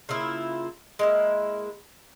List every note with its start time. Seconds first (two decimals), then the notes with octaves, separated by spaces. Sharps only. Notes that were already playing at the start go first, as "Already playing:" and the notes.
0.09 C#3 A#3 E4 F4
0.99 G#3 A#3 E4